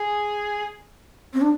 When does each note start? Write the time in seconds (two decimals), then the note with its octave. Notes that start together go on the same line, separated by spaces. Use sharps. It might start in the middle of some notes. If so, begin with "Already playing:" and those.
Already playing: G#4
1.34 C4
1.41 D4